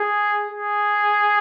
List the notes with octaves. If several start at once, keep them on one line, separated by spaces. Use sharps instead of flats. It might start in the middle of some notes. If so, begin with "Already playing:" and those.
Already playing: G#4
G#4